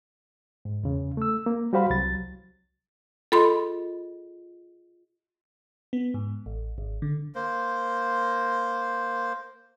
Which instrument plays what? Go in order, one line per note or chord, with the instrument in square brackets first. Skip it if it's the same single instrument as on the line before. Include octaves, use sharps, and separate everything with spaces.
[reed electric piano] G#2
E2 C#3
A3 E6
A#3
G3 F#4 G4 C5 F5 B5
C2 F#3 A6
[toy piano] F4 G#4 D#5 [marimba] A4 B5 C6
[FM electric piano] B3
G#2
A1
G#1
D3
[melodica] A#3 C5